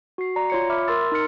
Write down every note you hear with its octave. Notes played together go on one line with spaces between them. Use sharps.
F#4 C7
D5 A#5
F4 C#5 C#7
E5 B5 D6 F6
A#4 C6 E6 A6
D#4 A#4 F6 C#7